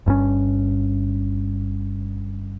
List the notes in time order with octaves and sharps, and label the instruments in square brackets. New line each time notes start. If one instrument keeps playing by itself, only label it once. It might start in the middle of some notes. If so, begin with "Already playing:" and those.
[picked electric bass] G1 G2 C3 C#4